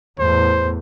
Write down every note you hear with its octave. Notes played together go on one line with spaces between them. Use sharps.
E2 A2 C5